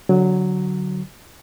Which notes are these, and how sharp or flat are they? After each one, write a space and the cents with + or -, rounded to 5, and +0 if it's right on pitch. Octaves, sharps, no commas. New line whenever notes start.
D3 -20 F#3 +0